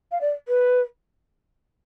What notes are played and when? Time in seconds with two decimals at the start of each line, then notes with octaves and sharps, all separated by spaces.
0.11 F5
0.21 D5
0.48 B4